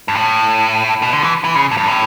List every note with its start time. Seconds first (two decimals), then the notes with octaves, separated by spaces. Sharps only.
0.08 G2
0.15 A2
1.02 B2
1.13 D3
1.23 E3
1.44 E3
1.55 C#3
1.71 A2
1.77 G2
1.88 A2